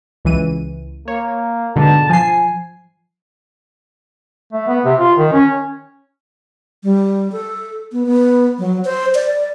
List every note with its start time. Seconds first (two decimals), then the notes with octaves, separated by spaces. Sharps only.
0.25 C#2 E3 D#7
1.08 A#3 C#5
1.76 G#2 B2 D3 A5
2.09 F3 G#5 C7
4.53 A3
4.68 B3
4.85 C3
4.99 F4
5.18 D#3
5.33 C#4
6.84 G3
7.32 A4
7.92 B3
8.06 B3
8.59 F#3
8.85 C5
9.15 D5